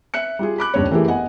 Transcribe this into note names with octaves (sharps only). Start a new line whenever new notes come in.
E5 F#6 C#7
G3 F4 G#4
B5 D6 F#6
D#1 G2 C#3 C#5
E3 A3 E4 G4 G#4 A#4
G1 D#5 F#5 G#5